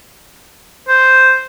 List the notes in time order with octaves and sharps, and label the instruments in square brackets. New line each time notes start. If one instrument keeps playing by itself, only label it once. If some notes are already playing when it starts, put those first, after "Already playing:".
[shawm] C5